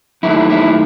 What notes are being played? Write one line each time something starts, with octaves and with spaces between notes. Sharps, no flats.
F#2 D#3 A3 E4
E4